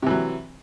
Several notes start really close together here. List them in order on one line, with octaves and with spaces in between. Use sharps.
C3 E3 F#3